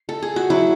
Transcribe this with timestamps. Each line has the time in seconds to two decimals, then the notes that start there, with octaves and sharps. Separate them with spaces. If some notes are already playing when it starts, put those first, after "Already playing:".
Already playing: B4
0.09 A4
0.22 G#4
0.36 F#4
0.50 F#3 E4